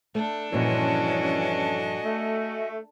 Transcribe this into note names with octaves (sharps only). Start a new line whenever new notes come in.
A3 D4 A4
G2 A#2 E3 F3 C#4 F#4 D#5 G#5
A3